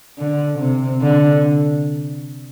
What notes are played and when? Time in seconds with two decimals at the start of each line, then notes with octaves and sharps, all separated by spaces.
0.18 D3
0.59 C3
1.01 D3